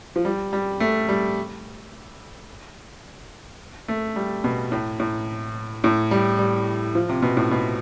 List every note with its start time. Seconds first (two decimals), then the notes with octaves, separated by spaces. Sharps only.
0.16 F3
0.25 G3
0.53 G3
0.80 A3
1.09 G3
3.88 A3
4.16 G3
4.44 B2
4.72 A2
5.00 A2
5.84 A2
6.11 G3
6.39 G3
6.95 F3
7.09 C3
7.22 B2
7.37 A2
7.51 B2